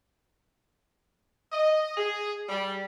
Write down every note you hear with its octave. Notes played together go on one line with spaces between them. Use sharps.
D#5
G#4
G3